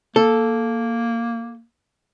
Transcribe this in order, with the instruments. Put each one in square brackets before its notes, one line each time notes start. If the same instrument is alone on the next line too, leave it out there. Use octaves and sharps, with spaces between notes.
[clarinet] A#3 [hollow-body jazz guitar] A4